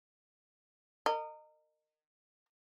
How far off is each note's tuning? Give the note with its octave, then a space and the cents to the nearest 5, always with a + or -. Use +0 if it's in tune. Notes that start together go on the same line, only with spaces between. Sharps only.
A#4 -25 D#5 -20